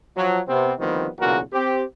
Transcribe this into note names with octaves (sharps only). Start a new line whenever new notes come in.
F3 F#3
C3 B3 C4
D2 D#3 F3 G3 B3 C4
B1 A#2 C#3 E3 F#4 A#4
C4 G4